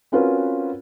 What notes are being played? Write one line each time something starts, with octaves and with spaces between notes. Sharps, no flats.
C4 C#4 F4 F#4 A#4 B4